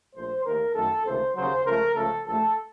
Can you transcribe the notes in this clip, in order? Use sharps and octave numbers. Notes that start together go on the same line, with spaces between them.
A#1 A2 A3 C5
D#2 D#3 A3 A#4
F#2 D#3 A3 A4
C#2 C3 D#3 A3 C5
D#2 C#3 F#3 C5
C#2 C#3 F3 A3 A#4
C#2 C#3 F3 A3 A4
A#1 A2 A3 A4